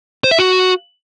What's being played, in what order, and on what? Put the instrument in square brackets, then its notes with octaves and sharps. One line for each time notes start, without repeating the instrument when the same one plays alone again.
[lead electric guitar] C5
E5
F#4